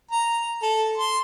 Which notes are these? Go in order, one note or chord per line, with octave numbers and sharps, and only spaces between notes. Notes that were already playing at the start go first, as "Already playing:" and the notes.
A#5
A4
C6